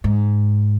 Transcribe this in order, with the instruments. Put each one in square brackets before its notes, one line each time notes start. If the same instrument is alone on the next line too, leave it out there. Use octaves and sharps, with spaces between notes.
[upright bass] G#2